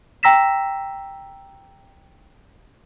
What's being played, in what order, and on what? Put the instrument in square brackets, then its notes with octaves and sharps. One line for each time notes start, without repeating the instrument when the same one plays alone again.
[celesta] G5 A#5 E6 A#6 B6 E7